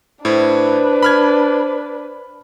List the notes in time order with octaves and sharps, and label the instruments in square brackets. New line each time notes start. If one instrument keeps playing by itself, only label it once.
[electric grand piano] A2 E4 [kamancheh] D4 B4 [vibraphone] C5
[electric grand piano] B5 F6 G#6